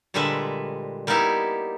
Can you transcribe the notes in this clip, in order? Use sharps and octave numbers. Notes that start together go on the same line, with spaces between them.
A#2 D3 G3 G#3 B4 E5
G3 A#3 B3 D#4 E4 G4